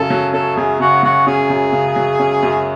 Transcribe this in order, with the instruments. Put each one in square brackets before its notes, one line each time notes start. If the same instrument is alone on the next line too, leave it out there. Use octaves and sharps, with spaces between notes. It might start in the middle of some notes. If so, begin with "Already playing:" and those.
Already playing: [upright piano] F#2 C#3 C#4 [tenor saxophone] A4
[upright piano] F#3
[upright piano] C#4 [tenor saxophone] A4
[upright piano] F#2 [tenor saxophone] G#4
[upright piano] C#3 [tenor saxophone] F#4
[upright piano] F#3 [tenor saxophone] F#4
[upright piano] C#4 [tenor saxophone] G#4
[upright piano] F#2
C#3
F#3
C#4
F#2